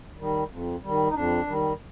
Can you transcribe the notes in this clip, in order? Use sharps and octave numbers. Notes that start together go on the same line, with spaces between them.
D#3 G3
F2
D#3 G3
D#4
F2 D4
D#3 G3